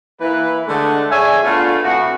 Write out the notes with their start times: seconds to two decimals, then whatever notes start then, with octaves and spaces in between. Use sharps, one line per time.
0.21 E3 A#3 E4 B4
0.67 D3 G#3 A3
1.11 G#4 C#5 D5 E5 G#5
1.44 A3 B3 D4 F4
1.84 A2 E3 C4 F#4